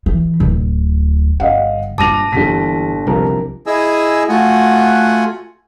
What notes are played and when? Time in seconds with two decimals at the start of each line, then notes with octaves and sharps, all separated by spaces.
0.06 E3
0.40 D1
1.40 G1 D#5 F5 F#5
1.98 G1 G2 A#2 A5 D6 A#6 D#7 F7
2.33 G1 A#2 E3 B6
3.07 C2 C3 F3 A#4
3.67 E4 G#4 D#5 G#5 E6
4.29 A3 F4 F#4 F#5 G#5